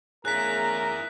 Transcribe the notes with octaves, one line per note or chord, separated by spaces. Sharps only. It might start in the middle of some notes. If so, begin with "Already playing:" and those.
C#3 A3 E4 G#4 A#4 A#5 F#6 B6